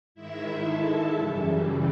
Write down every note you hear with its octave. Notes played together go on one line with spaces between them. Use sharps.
G#2 D#3 G#3 E4 E5
A4 A5
F#2 C#3 E3 G3